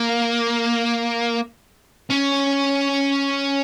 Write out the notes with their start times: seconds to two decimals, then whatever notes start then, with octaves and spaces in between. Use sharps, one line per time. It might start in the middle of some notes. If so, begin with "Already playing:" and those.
Already playing: A#3
2.10 C#4